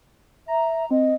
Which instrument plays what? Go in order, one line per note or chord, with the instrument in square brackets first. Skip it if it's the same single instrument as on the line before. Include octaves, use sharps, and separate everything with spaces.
[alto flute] E5 [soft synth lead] A#5
[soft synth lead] C4 [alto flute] D#5